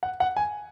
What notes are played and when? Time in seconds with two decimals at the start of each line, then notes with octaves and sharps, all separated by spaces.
0.03 F#5
0.20 F#5
0.37 G#5